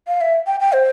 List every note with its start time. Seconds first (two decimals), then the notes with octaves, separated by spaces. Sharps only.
0.07 F5
0.21 E5
0.47 G5
0.60 G5
0.73 C5